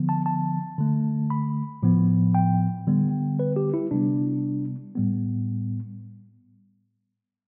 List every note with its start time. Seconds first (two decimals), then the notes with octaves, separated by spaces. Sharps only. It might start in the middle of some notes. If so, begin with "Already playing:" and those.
Already playing: D3 F3 B3
0.09 A5
0.26 A5
0.78 D3 A3
1.30 B5
1.83 A2 F3 B3
2.35 G5
2.87 D3 G3 B3
3.39 B4
3.56 G4
3.74 E4
3.91 C3 G3 B3 D4
4.96 A2 G3 B3